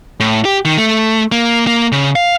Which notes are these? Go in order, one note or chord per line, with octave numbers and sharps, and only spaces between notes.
A2
G4
D#3
A3
A#3
A#3
C#3
F5